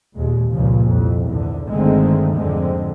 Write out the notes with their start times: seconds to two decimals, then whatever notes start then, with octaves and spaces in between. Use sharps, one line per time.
0.17 D#2 A#2 G#3
0.51 C#2 G2 A#2 C#3 F3
0.86 C2 F2
1.27 E2 G#2 D3
1.69 G1 D3 D#3 G#3 A3 C4
2.37 F2 G#2 D3 G#3 C4